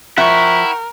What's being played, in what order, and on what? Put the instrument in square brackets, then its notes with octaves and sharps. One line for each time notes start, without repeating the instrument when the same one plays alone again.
[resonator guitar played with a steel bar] F3 E5 [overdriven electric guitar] E4 [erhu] A#4 [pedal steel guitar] F#5 G5 C#6